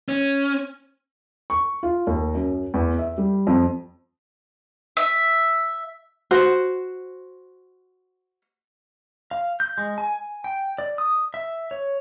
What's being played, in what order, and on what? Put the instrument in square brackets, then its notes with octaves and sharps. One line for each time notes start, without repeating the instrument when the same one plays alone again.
[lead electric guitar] C#4
[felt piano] C#6
F4
D#2
F#2
E2
E5
G3
F2
[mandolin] E5
[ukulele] F#4 C5
[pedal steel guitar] F5
G6
G#3
G#5
G5
D5
D#6
E5
C#5